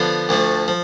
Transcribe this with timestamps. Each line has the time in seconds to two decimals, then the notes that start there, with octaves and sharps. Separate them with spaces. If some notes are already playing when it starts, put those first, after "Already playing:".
Already playing: D3 F3 B3 F4
0.29 D2 D3 F3 A3
0.68 F3